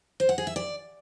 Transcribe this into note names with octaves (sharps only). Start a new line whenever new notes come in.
C5
F#5
G#4
E5
D5